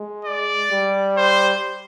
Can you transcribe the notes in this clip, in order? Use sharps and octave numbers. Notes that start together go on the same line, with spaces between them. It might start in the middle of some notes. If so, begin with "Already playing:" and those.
Already playing: G#3
D5
G3
C5